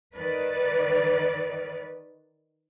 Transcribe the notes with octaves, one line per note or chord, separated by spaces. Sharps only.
D#3 B4 D5